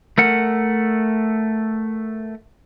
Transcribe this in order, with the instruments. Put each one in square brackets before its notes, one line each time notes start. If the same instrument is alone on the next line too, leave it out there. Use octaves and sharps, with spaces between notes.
[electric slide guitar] A3 A#4 F#5